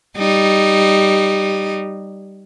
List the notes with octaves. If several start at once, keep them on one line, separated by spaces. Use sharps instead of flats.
G3 D#4